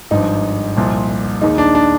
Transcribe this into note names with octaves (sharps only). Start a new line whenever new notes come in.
G#1 G2 F3 D#4
C2 A#2 F3
D#2 D#3 G#3 D#4
D4
D4